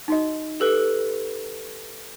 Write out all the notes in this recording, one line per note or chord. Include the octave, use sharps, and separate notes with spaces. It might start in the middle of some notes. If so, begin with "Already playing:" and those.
D#4 F#4 D#5
G4 A4 B4